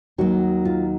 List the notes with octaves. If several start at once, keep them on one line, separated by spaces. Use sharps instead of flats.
D#2 D#3 F#3 F#4
F4